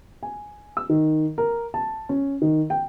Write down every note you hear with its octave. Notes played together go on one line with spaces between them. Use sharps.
G#5
E6
D#3
A#4
A5
C#4
D#3
G5